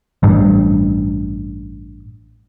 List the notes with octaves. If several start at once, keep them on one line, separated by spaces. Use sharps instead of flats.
A1 G2